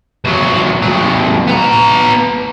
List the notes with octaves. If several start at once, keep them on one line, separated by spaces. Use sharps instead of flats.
C2 F#3
C3 F#3
B3 A#5